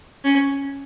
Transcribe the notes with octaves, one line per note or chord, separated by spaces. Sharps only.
C#4